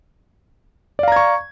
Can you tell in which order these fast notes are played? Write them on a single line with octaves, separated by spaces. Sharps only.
D5 F5 A#5 G#6 C#6